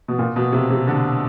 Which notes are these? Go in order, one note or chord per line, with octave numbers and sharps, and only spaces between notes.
B2
A#2
B2
C3
C3
D3